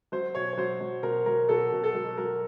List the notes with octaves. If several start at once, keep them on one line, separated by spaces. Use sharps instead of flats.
F#3 C5
B2 C#5
C#5
F#3 C5
F#3
B2 A#4
F#3 A#4
B2 A4
B2
A4
F#3
F#3 A#4